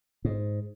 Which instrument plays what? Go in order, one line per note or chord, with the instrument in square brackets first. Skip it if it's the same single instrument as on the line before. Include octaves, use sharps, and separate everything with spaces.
[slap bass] G#2